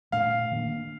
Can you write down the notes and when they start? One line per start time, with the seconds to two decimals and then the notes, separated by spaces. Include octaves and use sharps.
0.12 A#2 A3 D4 F5
0.52 D#3 A#3 D4